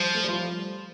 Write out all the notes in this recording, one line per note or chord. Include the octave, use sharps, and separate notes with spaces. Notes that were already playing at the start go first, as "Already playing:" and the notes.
Already playing: F3 G3
A3
G3
F3